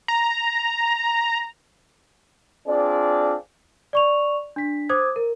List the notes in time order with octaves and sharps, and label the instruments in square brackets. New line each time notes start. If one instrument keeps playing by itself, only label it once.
[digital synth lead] A#5
[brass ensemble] C4 D4 F4 G#4 D5
[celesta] D5 C#6 F7
D4 B6
C5 D6 D#6 G#6
A#4